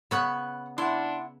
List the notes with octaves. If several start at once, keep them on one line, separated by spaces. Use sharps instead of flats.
C#3 B3 B4 B5 C#6 F#6
D4 E4 F#5 C6